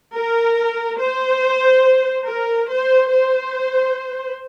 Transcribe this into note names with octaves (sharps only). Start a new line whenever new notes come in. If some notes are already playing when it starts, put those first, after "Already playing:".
A#4
C5
A#4
C5
C5